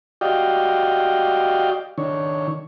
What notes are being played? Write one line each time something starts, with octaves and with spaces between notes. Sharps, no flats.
F#4 G4 D5 D#5 F5 G5
D#3 D4 C#5